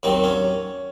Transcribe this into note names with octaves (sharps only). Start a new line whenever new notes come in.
D#2 D#3 F#3 C4
C#4